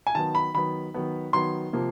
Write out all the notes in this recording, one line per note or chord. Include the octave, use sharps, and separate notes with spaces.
G#5
D#3 F#3 B3 A5
B5
D#3 F#3 B3 B5
D#3 F#3 B3
D#3 F#3 B3 C6
C3 F3 A#3